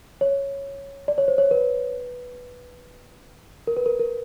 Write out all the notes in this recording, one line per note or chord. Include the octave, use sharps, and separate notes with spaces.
C#5
D5
C#5
C5
C#5
B4
A#4
B4
A#4
A#4